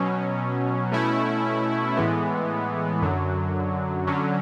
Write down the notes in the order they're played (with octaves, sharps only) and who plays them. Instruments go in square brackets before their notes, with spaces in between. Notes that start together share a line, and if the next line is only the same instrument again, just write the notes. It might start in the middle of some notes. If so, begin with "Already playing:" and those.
Already playing: [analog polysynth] B2 F#3 C#4
B2 A3 C#4 E4
A2 E3 G#3 B3
F#2 D3 F#3
D3 F#3 C#4